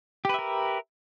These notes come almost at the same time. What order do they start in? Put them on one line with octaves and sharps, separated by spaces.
G4 B4 E5 A#4